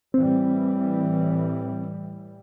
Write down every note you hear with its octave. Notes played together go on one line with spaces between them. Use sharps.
A2 E3 G3 C4